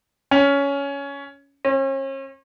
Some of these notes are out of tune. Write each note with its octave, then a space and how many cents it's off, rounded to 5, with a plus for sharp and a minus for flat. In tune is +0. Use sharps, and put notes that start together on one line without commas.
C#4 +15
C#4 -40